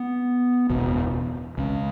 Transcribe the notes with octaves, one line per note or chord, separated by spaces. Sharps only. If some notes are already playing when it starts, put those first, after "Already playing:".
Already playing: B3
F#1 E2 B2
C#2 C#3